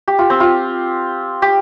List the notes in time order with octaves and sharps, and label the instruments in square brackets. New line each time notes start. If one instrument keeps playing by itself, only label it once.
[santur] G4
F4
C4
F4
G4